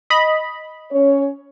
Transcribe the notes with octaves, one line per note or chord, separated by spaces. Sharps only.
D#5 B5
C#4 C#5